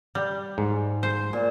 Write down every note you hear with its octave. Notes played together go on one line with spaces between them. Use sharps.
G3
G#2
C5
A#2